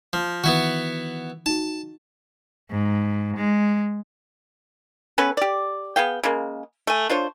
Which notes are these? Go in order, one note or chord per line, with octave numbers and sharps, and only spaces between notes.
F3
D#3 E3 B3 E4 F#4
D#4 F#4 A5
G#2
G#3
B3 C#4 A4 B4
G4 D5
B3 G#4 F5 G5
C#3 G#3 A#3
A3 G#5
D4 F4 C5 C#5